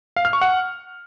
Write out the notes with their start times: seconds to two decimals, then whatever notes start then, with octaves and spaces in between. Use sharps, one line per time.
0.16 F5
0.25 F6
0.33 C#6
0.41 F#5